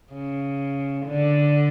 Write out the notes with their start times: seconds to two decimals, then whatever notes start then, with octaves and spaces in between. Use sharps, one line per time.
0.13 C#3
1.06 D3